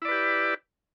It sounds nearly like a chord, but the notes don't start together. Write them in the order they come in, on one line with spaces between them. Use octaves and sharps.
E4 D5 B4 G4